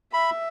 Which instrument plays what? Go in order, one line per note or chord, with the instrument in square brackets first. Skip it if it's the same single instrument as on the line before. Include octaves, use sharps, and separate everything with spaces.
[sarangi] E5 [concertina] B5